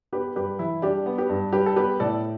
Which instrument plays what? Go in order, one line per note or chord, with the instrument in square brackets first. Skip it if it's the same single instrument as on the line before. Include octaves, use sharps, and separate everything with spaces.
[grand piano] B3 G4 B4
G2 G4 B4
E3 E4
G3 D4 G4
B3
G4 B4
G2
G3 G4 B4
A4
B3 G4 B4
A2 A4 D5